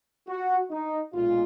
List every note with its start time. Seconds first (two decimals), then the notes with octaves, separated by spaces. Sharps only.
0.27 F#4
0.70 D#4
1.13 B1 A#2 G#3 F4